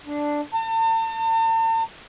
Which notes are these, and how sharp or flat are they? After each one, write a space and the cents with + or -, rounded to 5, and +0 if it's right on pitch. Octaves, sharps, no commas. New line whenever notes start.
D4 +0
A5 +45